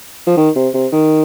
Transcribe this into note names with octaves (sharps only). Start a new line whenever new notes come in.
F3
D#3
C3
C3
D#3